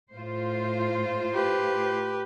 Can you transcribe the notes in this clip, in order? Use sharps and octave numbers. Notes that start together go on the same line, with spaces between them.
A2 F4 C5
G4 B4